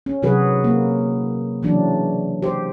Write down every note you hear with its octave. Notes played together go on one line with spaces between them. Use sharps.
C#4
C3 D#3 F#3 F#4 G#4 B4
A#3
C#3 E3 F#3 D4
G4 C5